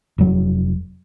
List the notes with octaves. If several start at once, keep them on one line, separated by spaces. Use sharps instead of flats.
F1 F#3